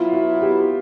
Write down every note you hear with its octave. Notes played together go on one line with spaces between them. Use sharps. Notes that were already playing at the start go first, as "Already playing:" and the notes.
Already playing: F#3 B3 E4 F4
F#4
G4